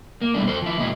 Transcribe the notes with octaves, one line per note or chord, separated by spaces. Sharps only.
A#3
B2 E3 F3 G3 A3 D4
F2 A4 C5
F3 E4
E2 A#2 G#3 E4